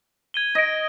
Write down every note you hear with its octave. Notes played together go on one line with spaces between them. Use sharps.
G#6 D#7 G7
D#5 G#6 A#6 D7